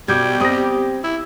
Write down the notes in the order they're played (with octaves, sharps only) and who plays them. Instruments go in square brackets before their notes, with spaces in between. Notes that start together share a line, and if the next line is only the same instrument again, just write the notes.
[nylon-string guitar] B2 [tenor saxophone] G3 [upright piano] D6 G6 G#6
[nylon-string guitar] C4 [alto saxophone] G4 [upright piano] D#6 A#6
[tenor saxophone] E4